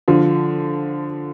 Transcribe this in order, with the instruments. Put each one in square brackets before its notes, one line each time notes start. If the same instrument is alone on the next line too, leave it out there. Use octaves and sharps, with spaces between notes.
[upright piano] D3 F3